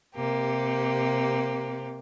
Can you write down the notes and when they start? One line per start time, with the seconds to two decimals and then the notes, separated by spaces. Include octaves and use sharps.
0.14 C3 A#3 G4